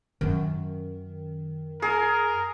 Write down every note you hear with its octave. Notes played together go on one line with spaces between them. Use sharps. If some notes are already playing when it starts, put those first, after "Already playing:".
F#2 D#3 C#4
G#4 A#4